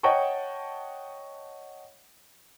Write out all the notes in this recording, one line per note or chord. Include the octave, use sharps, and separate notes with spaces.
C#5 D#5 F#5 G5 A5 C#6